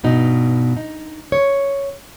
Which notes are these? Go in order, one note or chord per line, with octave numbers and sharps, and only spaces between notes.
G2 B2 D#4
D#4
C#5